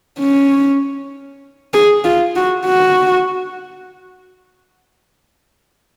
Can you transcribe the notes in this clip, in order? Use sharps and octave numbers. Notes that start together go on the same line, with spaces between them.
C#4
G#4
F4
F#4
F#4